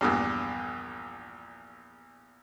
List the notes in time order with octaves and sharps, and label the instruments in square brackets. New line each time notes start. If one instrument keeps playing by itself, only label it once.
[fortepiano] A#1 E2 G2